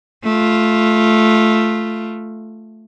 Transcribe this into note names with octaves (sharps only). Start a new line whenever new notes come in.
A3 F4